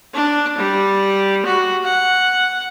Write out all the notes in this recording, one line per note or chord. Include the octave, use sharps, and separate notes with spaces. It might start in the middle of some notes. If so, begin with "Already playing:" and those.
D4
G3
F#4
F#5